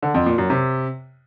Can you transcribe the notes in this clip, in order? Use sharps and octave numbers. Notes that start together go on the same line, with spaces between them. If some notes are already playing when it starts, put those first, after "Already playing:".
D3
F2
A#2
F#2
C3